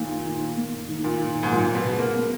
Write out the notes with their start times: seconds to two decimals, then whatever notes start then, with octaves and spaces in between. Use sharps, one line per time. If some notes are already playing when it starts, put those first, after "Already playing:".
Already playing: A#2 D#3 A#3
0.26 D#3
0.57 A#3
0.89 D#3
1.04 A#2
1.20 D#3
1.43 G#2
1.52 A#2 F#3
1.75 B2
1.83 C#3
1.99 A#3
2.14 B3